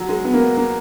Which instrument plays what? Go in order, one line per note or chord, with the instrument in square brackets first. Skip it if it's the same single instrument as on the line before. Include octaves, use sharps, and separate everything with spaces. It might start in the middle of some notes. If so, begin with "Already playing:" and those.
Already playing: [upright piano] F#3
G#3
B3
A#3
B3
A#3